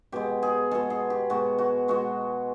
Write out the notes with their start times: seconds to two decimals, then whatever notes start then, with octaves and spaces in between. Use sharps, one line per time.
0.12 B2 G#3 G4
0.43 G#4
0.71 B2 G#3 A4
0.90 G#4
1.10 G4
1.30 B2 G#3 F#4
1.58 F#4
1.88 B2 G#3 F#4